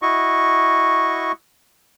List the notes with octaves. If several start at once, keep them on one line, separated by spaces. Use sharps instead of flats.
E4 F#4 D#5 C#6